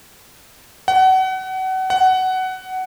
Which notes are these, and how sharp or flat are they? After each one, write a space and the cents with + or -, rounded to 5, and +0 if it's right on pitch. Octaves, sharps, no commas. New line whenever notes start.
F#5 +30
F#5 +15